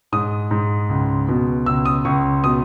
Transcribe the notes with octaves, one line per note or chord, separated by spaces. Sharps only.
G#2 D#6
G#2
C#2
B2
C#2 E6
D#6
C#2 C#6
B2 D#6